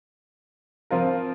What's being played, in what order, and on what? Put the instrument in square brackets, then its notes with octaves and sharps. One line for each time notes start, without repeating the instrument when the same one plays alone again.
[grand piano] F3 C4 F4 A#4